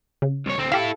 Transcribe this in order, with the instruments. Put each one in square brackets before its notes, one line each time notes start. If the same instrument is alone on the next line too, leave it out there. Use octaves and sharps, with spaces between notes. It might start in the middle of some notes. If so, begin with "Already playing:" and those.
[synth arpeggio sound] C#3
[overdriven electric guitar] C2 C#5
D2 C4
[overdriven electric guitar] E4 A4 [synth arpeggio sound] G4 F5